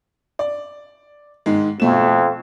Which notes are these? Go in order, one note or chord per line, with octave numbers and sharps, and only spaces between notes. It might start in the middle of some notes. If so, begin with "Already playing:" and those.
D5
G#2 D#3 G#3
F2 B2 A3 E7